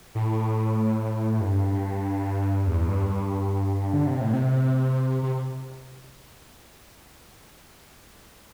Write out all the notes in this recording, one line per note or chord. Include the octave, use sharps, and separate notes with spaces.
A2
G2
E2
G2
G2
D3
C3
A2
C3
C3